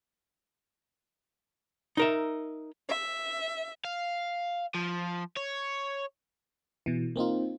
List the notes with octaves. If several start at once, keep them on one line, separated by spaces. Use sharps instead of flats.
D#4 A#4 E5
E5
F5
F3
C#5
B2 E3
A#3 C4 D#4 F4